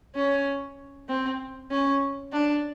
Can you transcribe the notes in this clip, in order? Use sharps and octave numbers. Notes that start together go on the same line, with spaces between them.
C#4
C4
C#4
D4